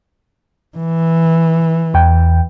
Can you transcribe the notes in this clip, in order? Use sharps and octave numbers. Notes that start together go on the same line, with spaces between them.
E3
E2 G5